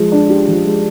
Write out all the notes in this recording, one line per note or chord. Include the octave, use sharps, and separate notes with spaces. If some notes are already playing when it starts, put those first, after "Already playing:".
Already playing: F3 G#3
D4
G4
F3
G#3